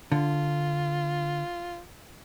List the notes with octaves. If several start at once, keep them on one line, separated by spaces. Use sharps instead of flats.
D3 F4